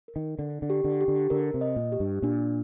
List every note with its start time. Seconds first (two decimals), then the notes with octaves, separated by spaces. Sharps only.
0.08 A#4
0.16 D#3
0.39 D3 D4
0.62 D3
0.70 G4
0.84 D3
1.01 G4
1.08 D3
1.30 D3 A#4
1.54 C3
1.61 D#5
1.76 A#2
1.92 G4
2.00 G2
2.22 A#2 D4